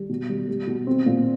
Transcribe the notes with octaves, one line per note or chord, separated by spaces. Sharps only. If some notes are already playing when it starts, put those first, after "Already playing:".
Already playing: G3
B2
G3
G3
B2
C4
A#2